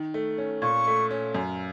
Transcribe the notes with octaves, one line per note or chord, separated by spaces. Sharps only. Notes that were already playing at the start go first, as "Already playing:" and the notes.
Already playing: D#3
A3
C#4
A#2 C#6
A3
C#4
F#2